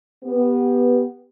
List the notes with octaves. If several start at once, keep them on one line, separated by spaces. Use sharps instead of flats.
B3 G4